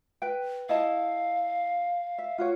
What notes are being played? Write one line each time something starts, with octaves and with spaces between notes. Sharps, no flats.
B4 G5
E4 D#5 F5 A5
E5
F4 F#4 C#5